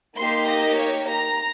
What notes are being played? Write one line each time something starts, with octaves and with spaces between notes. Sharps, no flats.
A#3 D#4 G4 C6
D#5
C#5
A#5